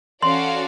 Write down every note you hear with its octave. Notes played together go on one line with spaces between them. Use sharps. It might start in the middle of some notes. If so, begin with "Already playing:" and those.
C#4 F#4 A4 D5 F5 C6